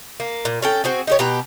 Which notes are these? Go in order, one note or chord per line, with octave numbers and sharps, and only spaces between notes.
A#3
A#2
C#4 A4 G5
C4 F#4 G#4
D#4 G4 C#5
B2 G4 A#5